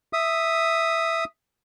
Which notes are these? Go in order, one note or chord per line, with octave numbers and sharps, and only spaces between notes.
E5 D#6